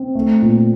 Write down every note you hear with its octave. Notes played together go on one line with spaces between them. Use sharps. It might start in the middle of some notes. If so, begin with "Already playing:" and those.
Already playing: C4
A3
A#2